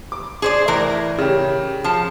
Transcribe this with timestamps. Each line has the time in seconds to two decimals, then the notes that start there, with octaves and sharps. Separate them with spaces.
0.12 D6
0.42 G#4 C5 D5
0.68 A2 E3 A#4
1.18 C#3 G4
1.84 F3 A5